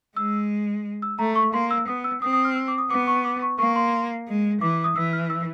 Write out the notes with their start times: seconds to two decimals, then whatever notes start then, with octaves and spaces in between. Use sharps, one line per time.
0.16 G#3 E6
1.02 E6
1.19 A3 A#5
1.35 C#6
1.53 A#3 C6
1.71 E6
1.87 B3 D#6
2.04 E6
2.22 C4 D#6
2.33 D#6
2.45 F6
2.56 E6
2.68 D6
2.78 D#6
2.90 B3 D6
3.07 C#6
3.25 D6
3.42 C#6
3.59 A#3 C#6
3.76 C6
4.28 G#3
4.61 E3 D6
4.73 D6
4.84 D#6
4.96 E3 E6
5.13 F6
5.30 E6